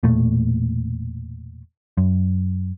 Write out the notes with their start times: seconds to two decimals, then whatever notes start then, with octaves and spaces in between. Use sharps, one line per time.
0.03 E1 A#2 A3
1.97 F#2